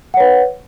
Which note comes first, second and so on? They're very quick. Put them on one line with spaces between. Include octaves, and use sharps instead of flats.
F#5 C#5 B4